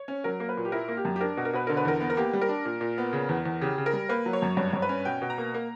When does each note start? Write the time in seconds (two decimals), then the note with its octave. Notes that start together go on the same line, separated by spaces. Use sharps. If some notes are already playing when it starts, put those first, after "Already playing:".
Already playing: C#5
0.08 C#4
0.24 F#3 A#4
0.40 A#3
0.49 B4
0.57 A#2
0.65 G4
0.72 E4 A#4
0.88 A#3
0.97 G4
1.05 F#2
1.16 G4
1.21 D4 A#4
1.37 B2
1.45 A#4
1.53 B2 B4
1.67 D3 A#4
1.77 B4
1.85 E2 A#4
2.01 B3
2.10 A#4
2.17 A#3 G4
2.33 G3
2.41 A#4
2.49 D4
2.65 A#2
2.81 A#2
2.98 B3
3.13 C#3
3.29 E2
3.46 E2
3.61 C#3 G4
3.78 C#3
3.86 A#4
3.93 G3
4.09 A#3 B4
4.26 F#3
4.33 C#5
4.42 F#2
4.57 G2 C#5
4.73 G2 C#5
4.82 B4
4.89 C#4
5.05 B2 G5
5.22 B2
5.30 A#5
5.38 A#3
5.54 A#3